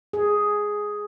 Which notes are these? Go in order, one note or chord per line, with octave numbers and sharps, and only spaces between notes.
G#4